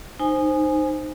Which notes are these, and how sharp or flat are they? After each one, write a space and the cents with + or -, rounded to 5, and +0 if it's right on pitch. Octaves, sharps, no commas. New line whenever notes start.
D#4 -20 C5 +0 G#5 +0